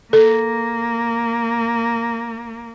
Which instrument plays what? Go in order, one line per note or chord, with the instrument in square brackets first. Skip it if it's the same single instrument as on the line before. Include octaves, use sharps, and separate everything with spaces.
[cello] A#3 [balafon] A4